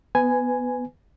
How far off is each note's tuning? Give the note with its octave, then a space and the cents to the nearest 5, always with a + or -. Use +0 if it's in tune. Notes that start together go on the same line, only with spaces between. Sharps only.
B3 +0 B4 +25 G#5 +0